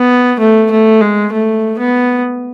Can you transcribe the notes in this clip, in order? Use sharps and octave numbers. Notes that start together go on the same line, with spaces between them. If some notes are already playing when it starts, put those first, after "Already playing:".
Already playing: B3
A3
A3
G#3
A3
B3